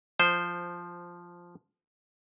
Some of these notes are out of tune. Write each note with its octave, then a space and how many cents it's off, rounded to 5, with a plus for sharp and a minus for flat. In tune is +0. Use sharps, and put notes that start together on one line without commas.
F3 +0 C5 -5